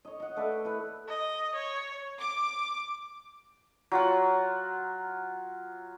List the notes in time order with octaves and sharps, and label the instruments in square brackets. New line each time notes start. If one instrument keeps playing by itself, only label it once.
[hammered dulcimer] C#5 D#5
D#5 F#5
A3 B4 D5 E5
E4 B4
[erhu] D#5
C#5
[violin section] D6
[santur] F#3 F4 F#5